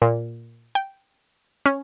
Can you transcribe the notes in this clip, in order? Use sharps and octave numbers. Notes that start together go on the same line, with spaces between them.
A#2
G5
C#4